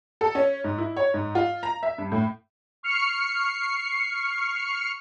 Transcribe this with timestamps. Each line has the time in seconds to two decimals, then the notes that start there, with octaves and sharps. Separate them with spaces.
0.21 A4
0.35 C#4
0.64 G#2
0.78 E4
0.96 C#5
1.14 G#2
1.35 F4
1.63 A#5
1.83 E5
1.98 G2
2.12 A2
2.83 C#6 F6 C7 C#7